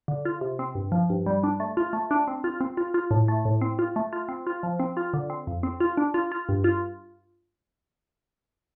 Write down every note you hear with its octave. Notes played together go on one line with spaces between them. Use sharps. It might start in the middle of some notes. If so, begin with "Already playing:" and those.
D3
F4
C3
C4
G2
F3
G2
G3
D4
A3
F4
A3
D4
C4
F4
C4
F4
F4
A2
A3
A2
C4
F4
A3
F4
C4
F4
F3
C4
F4
D3
C4
F2
C4
F4
D4
F4
F4
G2
F4